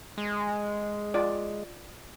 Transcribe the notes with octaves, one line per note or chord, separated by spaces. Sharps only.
G#3
F4 D5